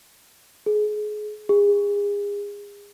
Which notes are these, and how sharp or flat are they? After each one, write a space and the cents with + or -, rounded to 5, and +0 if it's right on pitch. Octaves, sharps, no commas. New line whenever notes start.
G#4 +25
G#4 -35